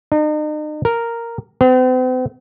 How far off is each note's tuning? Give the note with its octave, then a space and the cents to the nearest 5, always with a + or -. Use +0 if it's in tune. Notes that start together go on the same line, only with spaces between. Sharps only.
D#4 -40
A#4 -5
C4 -45